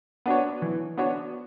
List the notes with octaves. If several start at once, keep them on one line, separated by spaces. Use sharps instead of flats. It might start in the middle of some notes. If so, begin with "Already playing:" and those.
B3 D4 F#4 C#5
E3
B3 D4 F#4 C#5